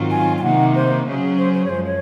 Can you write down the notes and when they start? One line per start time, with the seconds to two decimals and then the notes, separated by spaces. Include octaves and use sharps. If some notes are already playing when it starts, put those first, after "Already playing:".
Already playing: G#2 D#3 F#3 C4 F4
0.11 G#5
0.38 G#5
0.43 C3 D#3 A#3 D#4 F#5
0.75 C5
1.06 C#3 F#3 C#4 G#4
1.38 C5
1.54 C5
1.65 C#5
1.69 F#2 F3 G#3 C5
1.86 C#5